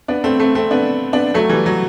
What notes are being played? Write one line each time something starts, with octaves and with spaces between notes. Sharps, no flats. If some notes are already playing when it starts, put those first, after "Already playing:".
B3 D4
A3 C4
A3 C4
A3 C4
B3 D4
B3 D4
F#3 A3
E3 G3
F#3